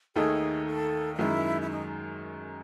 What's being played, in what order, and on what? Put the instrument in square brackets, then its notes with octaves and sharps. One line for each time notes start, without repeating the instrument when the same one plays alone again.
[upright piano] D#2 D#3 A3 D#4 A4 [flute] G#4
[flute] A4
D#4
[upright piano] F#2 D#3 G#3 [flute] E4
[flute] E4
D#4